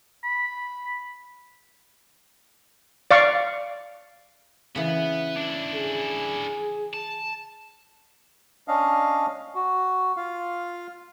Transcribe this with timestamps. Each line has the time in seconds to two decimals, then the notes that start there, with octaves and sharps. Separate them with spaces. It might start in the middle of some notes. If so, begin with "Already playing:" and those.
0.24 B5
3.11 D5 F5 C#6
4.76 C#3 E3 B3
5.37 D4 E4
5.75 G#4
6.94 A5
8.68 C#4 D4 D#5 F5
9.55 F#4
10.17 F4 F5